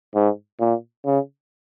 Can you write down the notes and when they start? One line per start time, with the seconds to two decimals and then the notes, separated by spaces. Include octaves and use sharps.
0.15 G#2
0.60 A#2
1.05 C#3